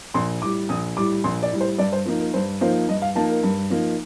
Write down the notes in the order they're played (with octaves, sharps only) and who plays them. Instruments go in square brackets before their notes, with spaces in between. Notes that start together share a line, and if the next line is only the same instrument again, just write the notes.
[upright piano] A#1 C6
A2 G3 D6
A#1 D#6
A2 G3 D6
A#1 C6
D5
A2 G3
C5
G2 D5
C5
F3 A#3 D#4
A#4
G2 C5
F3 A#3 D#4 C5
G2 D#5
F5
F3 A#3 D#4 A5
A#4
G2
F3 A#3 D#4